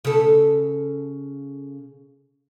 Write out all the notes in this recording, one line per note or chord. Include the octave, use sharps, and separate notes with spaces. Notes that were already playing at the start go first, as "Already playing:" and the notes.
C#3 A4